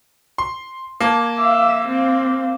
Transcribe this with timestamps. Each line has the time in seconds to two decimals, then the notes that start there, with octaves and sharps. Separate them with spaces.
0.38 C6
1.00 A#3 A5 D6 G#6
1.39 E5 F5 D6
1.88 C4